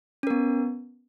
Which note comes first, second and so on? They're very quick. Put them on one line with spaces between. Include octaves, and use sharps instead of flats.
C#4 A#4 B3